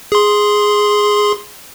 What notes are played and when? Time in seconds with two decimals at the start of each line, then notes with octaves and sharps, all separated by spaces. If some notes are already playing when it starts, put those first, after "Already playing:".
0.12 G#4 C6